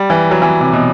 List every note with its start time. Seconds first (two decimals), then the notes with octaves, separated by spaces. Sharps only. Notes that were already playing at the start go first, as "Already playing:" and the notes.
Already playing: G3
0.10 E3
0.31 F#3
0.42 E3
0.61 C3
0.73 B2